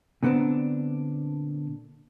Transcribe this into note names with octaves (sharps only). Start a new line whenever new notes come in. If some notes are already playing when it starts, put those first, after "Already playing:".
A#2 D3 B3 C4 D4